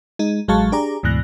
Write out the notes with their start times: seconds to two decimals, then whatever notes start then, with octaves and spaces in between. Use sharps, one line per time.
0.19 G#3 D#4
0.48 A1 F#3 G#3 F5 A5 C#6
0.72 D4 G4 G#4 D5 A#5
1.03 D2 G#2 B2 E3 F#6 A#6